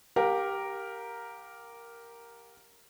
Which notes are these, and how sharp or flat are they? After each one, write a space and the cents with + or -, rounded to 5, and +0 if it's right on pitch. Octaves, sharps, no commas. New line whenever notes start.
G4 +0 A#4 +0 F5 +40